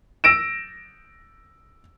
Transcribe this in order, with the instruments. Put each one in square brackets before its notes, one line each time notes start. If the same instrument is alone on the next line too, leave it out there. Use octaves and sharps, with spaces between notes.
[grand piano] E6 A#6 D7 E7